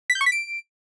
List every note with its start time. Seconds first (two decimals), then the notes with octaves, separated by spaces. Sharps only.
0.10 B6
0.15 G6
0.21 C#6
0.26 B6
0.32 D7